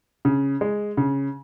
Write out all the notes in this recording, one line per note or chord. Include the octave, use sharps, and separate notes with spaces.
C#3
G#3
C#3